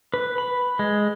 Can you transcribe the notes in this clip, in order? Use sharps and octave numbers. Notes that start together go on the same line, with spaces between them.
B4
B5
G#3